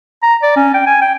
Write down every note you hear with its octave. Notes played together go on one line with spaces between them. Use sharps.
A#5
D5
C#4
G5
G#5
G5